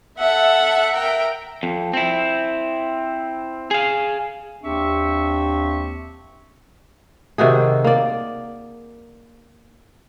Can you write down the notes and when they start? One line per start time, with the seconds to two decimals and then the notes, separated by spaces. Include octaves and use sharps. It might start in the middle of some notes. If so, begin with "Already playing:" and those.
0.19 A4 E5 F#5
0.93 A#4 G5
1.63 F2
1.93 C4 E4
3.71 G#4 F5
4.64 D#2 C4 D4 G4 E5 C#6
7.38 C3 D#3 F#4 G#4
7.85 A#3 D5